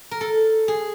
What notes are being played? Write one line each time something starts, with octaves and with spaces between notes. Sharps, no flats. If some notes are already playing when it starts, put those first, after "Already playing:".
A#4
A4
G#4